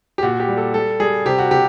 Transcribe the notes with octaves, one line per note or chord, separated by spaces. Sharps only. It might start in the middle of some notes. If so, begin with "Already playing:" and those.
G4
A#2 F#4
G4
G3
A4
G3 A4
G3 G#4
C3 G4
F#4
C3 G4